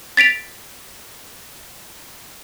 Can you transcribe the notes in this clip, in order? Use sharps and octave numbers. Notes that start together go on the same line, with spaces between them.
A6 B6 D7 F7